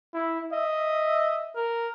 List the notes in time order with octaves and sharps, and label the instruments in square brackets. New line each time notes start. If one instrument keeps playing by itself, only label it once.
[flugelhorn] E4
[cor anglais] D#5 [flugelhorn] E5
[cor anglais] A#4